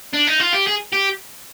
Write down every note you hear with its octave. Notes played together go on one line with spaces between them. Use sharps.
D4
D#4
F4
G4
G#4
G4